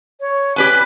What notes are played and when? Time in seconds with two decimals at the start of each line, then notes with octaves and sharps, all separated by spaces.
0.20 C#5
0.56 G4 B4 G#5 F#6